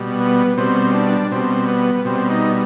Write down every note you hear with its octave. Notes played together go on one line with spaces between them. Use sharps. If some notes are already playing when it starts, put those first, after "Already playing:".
Already playing: B2 G3
B3
B2 G3 C4
D4
B2 G3 C4
B3
B2 G3 C4
D#4